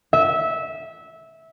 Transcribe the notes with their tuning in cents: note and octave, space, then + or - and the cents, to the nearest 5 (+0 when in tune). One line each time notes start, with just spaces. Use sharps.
E5 -15